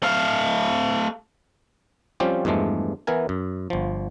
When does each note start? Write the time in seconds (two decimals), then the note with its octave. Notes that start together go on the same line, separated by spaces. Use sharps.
0.03 A3 F5
2.20 F3 G3 C4 C#4 F4 G4
2.45 E2 G2 F3 G#3 A3
3.07 E3 B3 E4 A#4 G#5
3.29 F#2
3.70 G1 F3